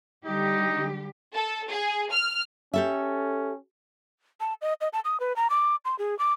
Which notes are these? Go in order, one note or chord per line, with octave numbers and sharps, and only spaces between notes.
D3 G3 D#4 G4
A4
G#4
F6
C#4 G4 A4 E5
A5
D#5
D#5
A5
D#6
B4
A#5
D6
C6
G#4
D6